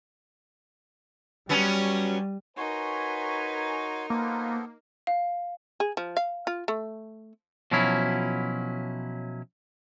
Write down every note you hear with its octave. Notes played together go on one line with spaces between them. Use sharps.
F#3 G3 B3 C#4
D#4 F#4 A#4 B4 C#5 G#5 C6
A#3 B3 F4 A4 B4 C5
F5
G#4
F3
F5
F4
A3
B2 F3 F#3 C#4 E4